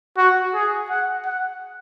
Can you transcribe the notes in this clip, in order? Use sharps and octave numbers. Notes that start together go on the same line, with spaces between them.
F#4
G#4
F#5
F#5